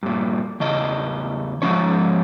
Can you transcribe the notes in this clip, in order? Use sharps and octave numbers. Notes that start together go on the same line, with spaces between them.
G2 A#2
E2 C#3 D#5
G#2 E3 F3 C#4 C#5